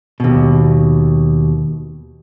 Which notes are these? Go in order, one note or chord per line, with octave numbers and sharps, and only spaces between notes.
D#2 B2